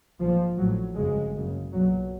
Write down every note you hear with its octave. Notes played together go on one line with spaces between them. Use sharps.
A#1 G#2 F3
A1 A2 F#3
G1 F2 C#3 G#3
F#1 F#2 C#3
B1 A#2 F#3